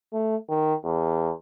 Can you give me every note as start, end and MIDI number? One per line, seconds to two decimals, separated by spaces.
0.13 0.36 57
0.49 0.74 51
0.83 1.33 40